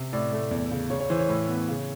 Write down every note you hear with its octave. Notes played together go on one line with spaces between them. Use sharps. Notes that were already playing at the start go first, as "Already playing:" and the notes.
Already playing: C3
A2 D5
A3
E2
C#3
C#3 C#5
C#5
E3 C5
C#5
A2
B3
C#3